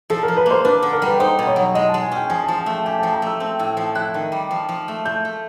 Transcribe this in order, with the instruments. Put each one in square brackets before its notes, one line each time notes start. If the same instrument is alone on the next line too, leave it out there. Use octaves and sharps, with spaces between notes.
[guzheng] F3 [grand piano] A4
[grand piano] A#4
[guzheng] F3
[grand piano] B4
[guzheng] A#3
[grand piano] C5
[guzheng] D4 [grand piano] B4
[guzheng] D3
[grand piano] A#4
[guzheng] G3 [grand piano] B4
[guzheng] D#4 [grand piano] C5
[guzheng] B2
[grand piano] C#5
[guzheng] F#3
[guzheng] G#3 [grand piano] D#5
[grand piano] A5
[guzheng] G#3
[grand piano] G#5
[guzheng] C#4 [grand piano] G5
[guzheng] F3 [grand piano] G#5
[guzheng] F3 [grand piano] A5
[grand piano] G5
[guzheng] A3
[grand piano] G5
[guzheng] G4 [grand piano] G#5
[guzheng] F3 [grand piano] A5
[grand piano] A#5
[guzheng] A3 [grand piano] E6
[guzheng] C4
A2
F3
[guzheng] E4 [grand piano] F#6
[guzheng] D#3
G3
F3
F3
A3
[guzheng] A3 [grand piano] G6
[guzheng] A3